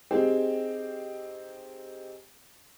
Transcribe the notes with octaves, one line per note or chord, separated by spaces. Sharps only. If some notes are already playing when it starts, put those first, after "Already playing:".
C4 D#4 G4 G#4